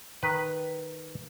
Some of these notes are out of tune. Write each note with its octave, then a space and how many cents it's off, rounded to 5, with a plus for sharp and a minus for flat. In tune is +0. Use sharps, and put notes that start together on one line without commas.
D#3 -5 B4 +0